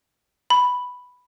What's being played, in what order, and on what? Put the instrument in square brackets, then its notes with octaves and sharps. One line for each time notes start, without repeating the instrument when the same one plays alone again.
[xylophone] B5